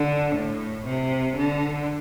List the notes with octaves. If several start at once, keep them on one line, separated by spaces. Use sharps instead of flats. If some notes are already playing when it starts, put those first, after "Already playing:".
Already playing: D3
A2
C3
D3